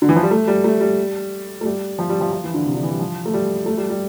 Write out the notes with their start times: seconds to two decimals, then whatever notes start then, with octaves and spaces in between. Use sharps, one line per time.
0.02 D3
0.09 E3
0.16 F3
0.23 G3
0.31 A3
0.47 G3
0.64 A3
0.80 G3
1.61 A3
1.65 G3
1.99 F3
2.09 G3
2.21 F3
2.32 F3
2.44 E3
2.54 D3
2.66 C3
2.75 D3
2.83 E3
2.91 G3
3.00 F3
3.26 A3
3.34 G3
3.66 A3
3.77 G3
3.90 G3